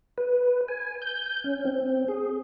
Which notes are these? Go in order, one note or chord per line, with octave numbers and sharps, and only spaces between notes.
B4
G#5
G6
C#4
C4
G#4